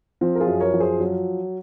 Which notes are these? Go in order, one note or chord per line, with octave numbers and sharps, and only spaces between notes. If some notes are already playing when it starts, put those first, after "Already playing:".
F3 C4
A#4
F4 G#4
F#2
A#4 C#5
F3
G#4 C5
F#3